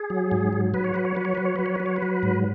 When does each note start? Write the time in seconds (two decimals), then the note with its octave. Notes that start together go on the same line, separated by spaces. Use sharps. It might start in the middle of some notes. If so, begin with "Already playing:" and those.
Already playing: G#4
0.10 F#3
0.31 G#2
0.53 F#3
0.74 F#3 B4
0.84 C#5
0.94 F#3 B4
1.05 C#5
1.15 F#3 B4
1.25 C#5
1.35 F#3 B4
1.45 C#5
1.56 F#3 B4
1.66 C#5
1.75 F#3 B4
1.86 C#5
1.96 B4
2.02 F#3
2.23 G#2